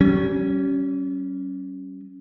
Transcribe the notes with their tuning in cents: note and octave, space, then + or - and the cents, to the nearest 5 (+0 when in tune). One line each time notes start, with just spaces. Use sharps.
G3 -40 C#4 +0